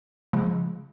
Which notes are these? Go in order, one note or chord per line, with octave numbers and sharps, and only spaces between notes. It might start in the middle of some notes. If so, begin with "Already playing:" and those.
C#3 F3 G#3